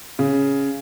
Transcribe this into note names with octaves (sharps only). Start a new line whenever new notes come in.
C#3